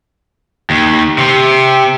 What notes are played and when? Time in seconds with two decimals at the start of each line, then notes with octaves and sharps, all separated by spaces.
0.70 D#2
1.18 C3